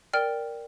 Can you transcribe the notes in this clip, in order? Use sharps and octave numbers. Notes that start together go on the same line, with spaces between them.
A#4 D5 G5 F6